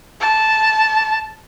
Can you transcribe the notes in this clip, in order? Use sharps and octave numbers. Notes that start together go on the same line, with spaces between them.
A5